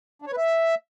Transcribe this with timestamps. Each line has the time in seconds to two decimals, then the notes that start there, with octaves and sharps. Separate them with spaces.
0.22 D4
0.27 C#5
0.32 B4
0.37 E5